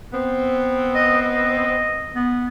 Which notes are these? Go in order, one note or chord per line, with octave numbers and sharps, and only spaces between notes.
B3 C4
D#5
D#5
B3